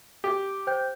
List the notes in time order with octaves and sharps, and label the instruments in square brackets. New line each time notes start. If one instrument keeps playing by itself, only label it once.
[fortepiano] G4
[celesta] C5 G5 G6